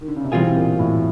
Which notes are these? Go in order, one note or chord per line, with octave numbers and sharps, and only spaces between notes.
D#3
D3
C#3
C3
B2 E3 G3 C4 F4 G#4
A#2
A2